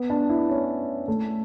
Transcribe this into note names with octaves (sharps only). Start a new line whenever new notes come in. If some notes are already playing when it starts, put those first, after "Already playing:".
Already playing: B3
D4
E4
C#4
A3